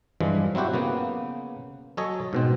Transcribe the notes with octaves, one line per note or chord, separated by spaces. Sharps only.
G2 E3 F3 G#3
F#3 C4 E4 F#4 G4
C#3 A#3 B3
F#3 A4 C#5 D#5 G#5
G#2 B2 C4